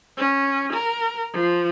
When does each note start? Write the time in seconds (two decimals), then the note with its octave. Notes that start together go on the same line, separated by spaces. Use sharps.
0.17 C#4
0.73 A#4
1.33 F3